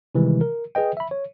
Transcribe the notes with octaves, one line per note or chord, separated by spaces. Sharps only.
C3 D#3 E3 G3 G#3
A#4
G#4 B4 D#5 G5
E5 B5
C#5